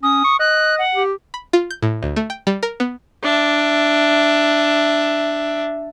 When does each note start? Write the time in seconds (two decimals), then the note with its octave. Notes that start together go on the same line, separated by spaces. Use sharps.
0.03 C#4 D#6
0.24 C#6
0.39 D#5 F#6
0.79 F#5
0.95 G4
1.34 B5
1.53 F4
1.71 G6
1.82 A2
2.03 D2
2.16 A3
2.30 G5
2.47 G3
2.63 A#4
2.80 B3
3.23 D4 E5